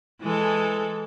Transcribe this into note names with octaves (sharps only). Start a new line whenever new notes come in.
E3 G#3 A4